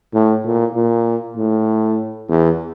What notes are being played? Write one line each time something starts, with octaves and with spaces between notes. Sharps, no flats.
A2
A#2
A#2
A2
E2